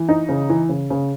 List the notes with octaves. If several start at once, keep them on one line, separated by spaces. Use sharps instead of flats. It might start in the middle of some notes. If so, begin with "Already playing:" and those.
Already playing: E3
D#4
C#3
E3
C#3
C#3